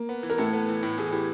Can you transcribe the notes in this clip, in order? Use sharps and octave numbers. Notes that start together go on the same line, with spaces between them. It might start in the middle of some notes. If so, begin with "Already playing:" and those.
Already playing: A#3
B3
E3
A#4
A2 A3 A4
B3
E3
A2
E3 G#4
E3 G4